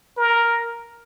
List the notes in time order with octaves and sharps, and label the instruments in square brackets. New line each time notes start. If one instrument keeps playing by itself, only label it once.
[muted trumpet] A#4